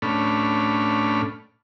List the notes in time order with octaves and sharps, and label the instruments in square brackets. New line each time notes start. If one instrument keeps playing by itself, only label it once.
[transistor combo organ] A2 A3 C#4 D4 B5 F6